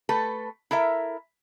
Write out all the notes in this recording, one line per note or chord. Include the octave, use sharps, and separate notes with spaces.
A3 A4 B4
E4 A4 A#4 E5